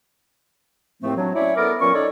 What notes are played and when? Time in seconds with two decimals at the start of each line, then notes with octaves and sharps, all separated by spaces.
1.03 D#2 A2 F3 A3 C4
1.17 F#3 D4
1.35 C#4 E4 C#5 D5 E5
1.57 B3 A4 A#4 D6 F6
1.81 A#2 F#3 C#4 C#6
1.95 D#4 A4 C#5 D5